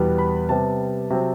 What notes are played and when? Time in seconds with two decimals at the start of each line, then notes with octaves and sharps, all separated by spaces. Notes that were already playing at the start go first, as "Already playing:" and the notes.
Already playing: E2 B2 G3 B3
0.18 B5
0.49 C3 G3 B3 A5
1.10 C3 F#3 C4